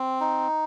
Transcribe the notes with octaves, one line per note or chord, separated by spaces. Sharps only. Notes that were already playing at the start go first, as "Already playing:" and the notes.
Already playing: C4
D#4